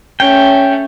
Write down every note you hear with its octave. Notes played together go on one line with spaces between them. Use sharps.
A3 C#4 G5